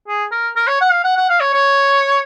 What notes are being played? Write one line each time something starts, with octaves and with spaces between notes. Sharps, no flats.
G#4
A#4
A#4
C#5
F#5
F5
F#5
F#5
F5
C#5
C#5